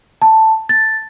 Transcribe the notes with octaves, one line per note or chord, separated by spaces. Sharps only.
A5
A6